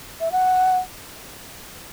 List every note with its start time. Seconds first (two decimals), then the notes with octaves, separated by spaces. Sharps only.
0.21 E5
0.32 F#5